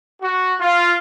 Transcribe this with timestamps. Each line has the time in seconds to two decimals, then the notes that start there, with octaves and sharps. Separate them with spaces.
0.21 F#4
0.60 F4